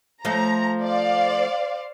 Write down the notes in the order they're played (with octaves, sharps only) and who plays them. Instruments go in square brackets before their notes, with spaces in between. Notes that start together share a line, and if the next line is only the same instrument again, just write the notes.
[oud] F3 A3 [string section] A#5
[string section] C5 D5 F5